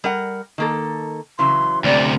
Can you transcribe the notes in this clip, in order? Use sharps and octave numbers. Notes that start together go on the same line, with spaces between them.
G3 A#4 F#5
D#3 A#3 A4
C#3 E3 F#3 C6
D2 C3 D5